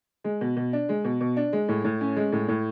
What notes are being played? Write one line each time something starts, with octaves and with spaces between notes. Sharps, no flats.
G#3
B2
B2
D4
G#3
B2
B2
D4
G#3
A2
A2
C#4
G#3
A2
A2